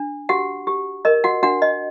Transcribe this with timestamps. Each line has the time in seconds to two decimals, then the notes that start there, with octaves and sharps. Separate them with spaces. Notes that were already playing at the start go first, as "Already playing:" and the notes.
Already playing: D4
0.29 F#4 G4 F#5
0.67 G4
1.05 A#4 D#5
1.24 F#4 F#5
1.43 D4 F#4 F#5
1.62 D#5